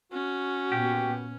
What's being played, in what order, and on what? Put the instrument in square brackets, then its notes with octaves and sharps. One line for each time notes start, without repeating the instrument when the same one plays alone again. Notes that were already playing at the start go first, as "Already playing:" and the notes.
[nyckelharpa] C#4 [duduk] F#4
[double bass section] A#2 B3 [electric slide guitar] G4